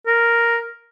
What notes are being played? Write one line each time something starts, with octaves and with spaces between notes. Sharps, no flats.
A#4